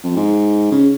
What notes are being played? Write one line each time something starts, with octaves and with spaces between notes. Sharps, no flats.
F2
G#2
C#3